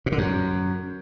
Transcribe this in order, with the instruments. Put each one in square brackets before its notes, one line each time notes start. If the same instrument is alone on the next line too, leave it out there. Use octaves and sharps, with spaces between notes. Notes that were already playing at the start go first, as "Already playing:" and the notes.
[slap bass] A#2
D3
F#2